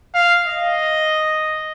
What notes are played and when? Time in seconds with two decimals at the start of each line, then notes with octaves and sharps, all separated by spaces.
0.15 F5
0.47 D#5